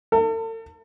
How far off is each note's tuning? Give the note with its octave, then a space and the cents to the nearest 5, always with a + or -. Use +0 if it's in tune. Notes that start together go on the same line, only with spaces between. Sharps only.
A4 +40